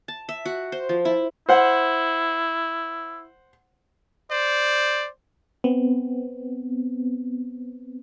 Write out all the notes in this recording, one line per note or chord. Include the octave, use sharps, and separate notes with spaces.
A5
E5
F#4
C5
F3
E4
E4 C5 F#5
C5 D5
B3 C4